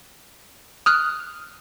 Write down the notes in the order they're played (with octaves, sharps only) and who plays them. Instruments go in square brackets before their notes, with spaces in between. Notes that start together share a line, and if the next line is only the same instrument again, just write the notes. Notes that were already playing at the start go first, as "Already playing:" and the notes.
[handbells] D#6 F6 F#6